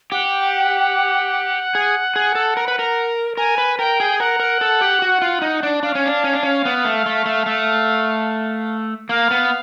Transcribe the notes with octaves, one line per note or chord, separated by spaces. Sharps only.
G4 F#5
G#4
G#4
A4
A#4
B4
A#4
A#4 G#5
B4
A#4 G5
G#4
A#4 F#5
A#4
A4
G4
F#4
F4
D#4
D4
D4 F5
C#4
D4
C#4
D4
C#4
B3
A3
A3
A3
A3
A#3 F5
B3